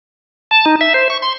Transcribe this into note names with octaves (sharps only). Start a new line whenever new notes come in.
A5
D#4
E5
C5
C#6
C6